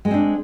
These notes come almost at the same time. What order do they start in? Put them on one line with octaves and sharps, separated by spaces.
G#3 D#4 C4 D4